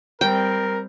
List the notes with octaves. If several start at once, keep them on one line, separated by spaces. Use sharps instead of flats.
G3 C4 A#4 G5